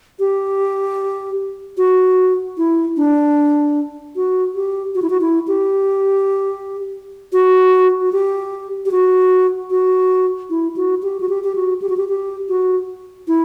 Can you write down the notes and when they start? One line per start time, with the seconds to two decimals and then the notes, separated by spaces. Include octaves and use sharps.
0.19 G4
1.77 F#4
2.58 E4
2.97 D4
4.16 F#4
4.55 G4
4.95 F#4
5.02 E4
5.10 F#4
5.21 E4
5.48 G4
7.33 F#4
8.01 F#4
8.12 G4
8.86 G4
8.91 F#4
9.70 F#4
10.50 E4
10.76 F#4
11.03 G4
11.20 F#4
11.29 G4
11.44 G4
11.55 F#4
11.82 G4
11.89 F#4
11.97 G4
12.08 G4
12.49 F#4
13.28 E4